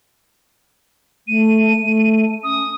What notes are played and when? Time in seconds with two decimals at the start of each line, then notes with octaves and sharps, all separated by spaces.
1.28 A3 D#7
1.83 A3
2.44 C#4 D#6